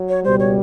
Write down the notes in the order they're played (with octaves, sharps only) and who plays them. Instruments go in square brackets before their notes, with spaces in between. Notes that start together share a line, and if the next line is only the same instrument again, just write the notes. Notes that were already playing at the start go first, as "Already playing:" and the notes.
Already playing: [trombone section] F#3
[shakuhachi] C#5
[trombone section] C#2 B2 G3 [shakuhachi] C5
[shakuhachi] C#5